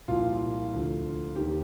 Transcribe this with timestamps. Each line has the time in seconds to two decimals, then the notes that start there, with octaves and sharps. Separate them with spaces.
0.08 C2 A#2 F3 F4
0.73 D2 D3 F3
1.36 D#2 D#3 G4